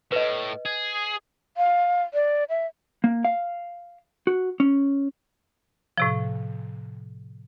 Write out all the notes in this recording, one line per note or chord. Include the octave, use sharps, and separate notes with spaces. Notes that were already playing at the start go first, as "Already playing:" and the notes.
A2 B4 D#5
G#4
F5
D5
E5
A#3
F5
F#4
C#4
A2 C3 F3